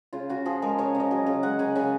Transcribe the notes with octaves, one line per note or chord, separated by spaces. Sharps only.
C#3 F4
C#3 F#4
F3 G#4
G#3 A#4
C#3 C#5
C#3
D#5
F#3
C#3
G#3 F#5
C#3 G#5
C#3 G#5